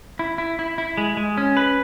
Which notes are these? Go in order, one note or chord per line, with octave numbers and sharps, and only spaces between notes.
E4
E4
E4
E4
G#3
G#3
C#4
B4